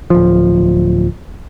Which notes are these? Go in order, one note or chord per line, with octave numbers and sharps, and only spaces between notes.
D1 F3